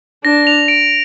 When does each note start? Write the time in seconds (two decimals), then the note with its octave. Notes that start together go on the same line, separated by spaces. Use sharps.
0.24 D4 A#6
0.47 F7
0.68 D7